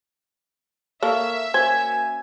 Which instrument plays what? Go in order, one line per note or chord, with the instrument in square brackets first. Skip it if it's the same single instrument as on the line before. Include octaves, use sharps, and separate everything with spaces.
[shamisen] A#3 A4 [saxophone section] A#4 C#5 [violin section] E5
[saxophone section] A#3 C#4 F#4 [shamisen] C5 [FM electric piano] G#5 G#6